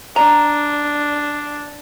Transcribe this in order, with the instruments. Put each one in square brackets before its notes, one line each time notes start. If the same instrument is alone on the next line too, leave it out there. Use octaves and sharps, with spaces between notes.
[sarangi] D4 [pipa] A#5